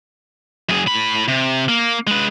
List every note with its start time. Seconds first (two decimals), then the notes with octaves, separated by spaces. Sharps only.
0.69 F#2 G#4
0.87 A2 B5
1.28 C3
1.69 A#3
2.07 G#3 B4